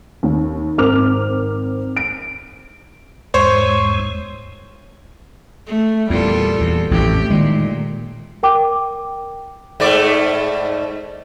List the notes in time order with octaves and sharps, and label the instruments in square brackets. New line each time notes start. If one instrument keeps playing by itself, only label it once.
[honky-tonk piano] D#2
G#1 C4 A#4 D6 F6 F7
D7
[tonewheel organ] E2 G#2 G#3 [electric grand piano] C5 C#5
[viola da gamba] A3
[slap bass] E2 A#2 [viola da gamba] G3 F4 A4
[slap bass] E2
[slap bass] A1 F2 [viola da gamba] A2 G4
[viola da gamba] A#2 [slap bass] D#3 G#3
[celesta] A#4 G5 D6
[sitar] G#2 A3 D5